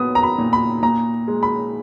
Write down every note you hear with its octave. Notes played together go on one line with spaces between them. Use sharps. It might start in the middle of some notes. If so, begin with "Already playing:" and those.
Already playing: A#2 F#3 B3 D#6
A#5
B5
A#2
B5
A#2 A#5
G#3
B5